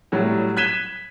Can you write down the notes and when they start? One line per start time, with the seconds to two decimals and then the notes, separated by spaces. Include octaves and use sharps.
0.12 A2 F#3 G3
0.57 F#6 G#6 B6 D#7 E7 G7